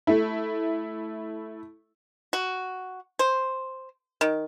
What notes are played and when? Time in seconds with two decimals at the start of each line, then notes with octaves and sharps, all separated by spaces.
0.07 A3 E4
2.33 F#4
3.19 C5
4.21 D#3